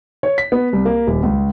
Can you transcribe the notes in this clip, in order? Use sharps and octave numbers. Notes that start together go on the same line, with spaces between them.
C#5
B6
B3
C2
A#3
D#1
C#2